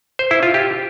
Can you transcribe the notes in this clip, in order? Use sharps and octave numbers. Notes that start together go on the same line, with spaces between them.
C5
E4
F4
G4